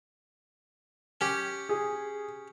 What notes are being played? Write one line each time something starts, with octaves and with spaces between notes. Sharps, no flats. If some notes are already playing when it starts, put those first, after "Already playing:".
C#4 G4
G#4